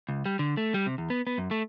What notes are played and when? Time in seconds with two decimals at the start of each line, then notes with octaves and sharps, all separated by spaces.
0.09 C#2
0.25 G3
0.39 D3
0.57 A3
0.74 G3
0.86 C3
0.98 E2
1.10 B3
1.27 B3
1.38 F#2
1.51 A3